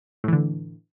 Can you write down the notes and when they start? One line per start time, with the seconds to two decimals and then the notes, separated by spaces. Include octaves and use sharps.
0.24 A2
0.28 E3
0.33 D3